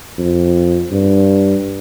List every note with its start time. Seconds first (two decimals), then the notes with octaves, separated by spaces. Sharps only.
0.18 F2
0.91 G2